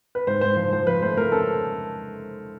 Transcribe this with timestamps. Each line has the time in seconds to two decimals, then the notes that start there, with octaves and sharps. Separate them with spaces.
0.15 B4
0.27 G#2 C5
0.41 G#2 C5
0.56 F3 C5
0.72 F3 C5
0.87 F3 B4
1.02 A3 C5
1.17 A3 A#4
1.32 C#4 A4